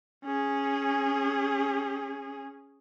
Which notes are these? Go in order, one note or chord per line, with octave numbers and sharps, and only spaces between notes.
C#4 G#4